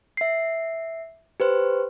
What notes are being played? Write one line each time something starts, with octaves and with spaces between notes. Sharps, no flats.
E5 C7
G4 B4 C5